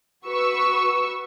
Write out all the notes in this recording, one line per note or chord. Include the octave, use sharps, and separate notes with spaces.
F#4 B4 C#6 E6